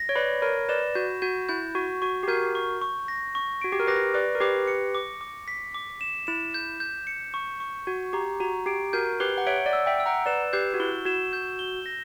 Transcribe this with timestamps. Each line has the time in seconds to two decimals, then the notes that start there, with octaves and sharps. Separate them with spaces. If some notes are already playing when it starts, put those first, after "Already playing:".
Already playing: A#6
0.09 C#5
0.16 B4 D5 B5
0.42 A#4 C#5 B5
0.69 B4 D5 E7
0.95 F#4 G6
1.22 F#4 G6
1.49 E4 G6
1.75 F#4 C#6
2.02 F#4 C#6
2.23 G4
2.28 F#4 A#4 G6
2.55 C#6
2.81 C#6
3.08 A#6
3.35 C#6
3.61 F#4 D7
3.72 G4
3.80 A#4
3.87 G4 B4 A#6
4.14 B4 D5 D6
4.35 A#4
4.41 G4 B4 D6
4.68 C#7
4.95 D6
5.21 D6
5.48 B6
5.74 D6
6.01 E7
6.27 E4 E7
6.54 G6
6.80 G6
7.07 C#7
7.34 C#6
7.60 C#6
7.87 F#4 G6
8.13 G4 A#5
8.40 F#4 A#5
8.66 G4 D7
8.93 F#4 A#4 G6
9.20 G4 B4 G7
9.38 F#5
9.46 C#5 E5 D7
9.66 D5 F#5
9.73 E6
9.86 E5 G5
10.00 E6
10.06 F#5 A#5
10.26 B4 D5 E7
10.53 G4 B4 G6
10.74 F#4
10.80 E4 G7
11.05 F#4 E7
11.33 G6
11.59 G7
11.86 A#6